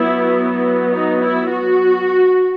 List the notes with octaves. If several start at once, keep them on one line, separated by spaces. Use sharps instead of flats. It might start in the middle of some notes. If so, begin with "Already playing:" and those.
Already playing: F#3 B3 E4
D#4
E4
F#4